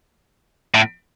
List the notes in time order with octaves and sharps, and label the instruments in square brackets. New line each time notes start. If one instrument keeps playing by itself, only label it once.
[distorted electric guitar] A2